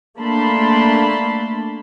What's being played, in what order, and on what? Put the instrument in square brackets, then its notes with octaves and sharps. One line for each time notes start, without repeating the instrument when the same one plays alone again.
[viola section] A3 A#3 D4 A5 B5 C6